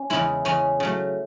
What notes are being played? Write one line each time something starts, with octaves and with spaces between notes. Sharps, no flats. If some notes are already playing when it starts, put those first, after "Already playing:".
Already playing: C#4
E2 C#3 G#3 E4
E2 C#3 G#3 C#4
C#3 F#3 A3